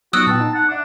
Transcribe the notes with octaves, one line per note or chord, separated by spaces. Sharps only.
F#3 B3 D#4 F#4 D#6 E6 F#6
A#2 B3 G5 A5
D#4
F#5
D4 E5 D6